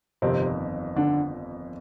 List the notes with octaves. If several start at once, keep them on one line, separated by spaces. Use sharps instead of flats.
G1 F2 C3 D#3 C4
D3 D4